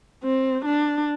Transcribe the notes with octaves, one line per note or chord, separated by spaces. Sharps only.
C4
D4